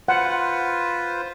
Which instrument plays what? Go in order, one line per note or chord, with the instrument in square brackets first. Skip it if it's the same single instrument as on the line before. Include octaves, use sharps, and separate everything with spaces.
[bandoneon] F4 B4 C5 [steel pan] F#5